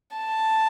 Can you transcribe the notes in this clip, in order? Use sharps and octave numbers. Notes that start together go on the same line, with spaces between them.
A5